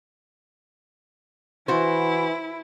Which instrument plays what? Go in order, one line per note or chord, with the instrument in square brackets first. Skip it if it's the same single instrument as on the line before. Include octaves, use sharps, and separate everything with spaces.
[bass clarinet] E3 [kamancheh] E4 [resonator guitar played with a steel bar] F#4 C5